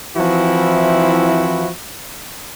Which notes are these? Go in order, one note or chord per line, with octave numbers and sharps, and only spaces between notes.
E3 F3 C4 E4 F#4